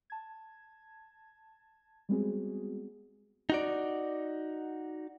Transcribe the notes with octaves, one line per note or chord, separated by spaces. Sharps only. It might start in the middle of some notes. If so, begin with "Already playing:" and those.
A5 G#6
G3 G#3 B3 C4 F#4 G#4
D#4 F#4 D5